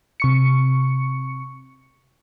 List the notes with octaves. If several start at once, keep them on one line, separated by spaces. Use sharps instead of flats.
C3 C#6 C#7